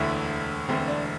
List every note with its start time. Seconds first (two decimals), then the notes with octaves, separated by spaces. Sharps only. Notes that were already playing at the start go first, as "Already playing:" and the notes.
Already playing: E1 D2 D3 E4
0.69 E1 D2 D3 C4
0.88 D4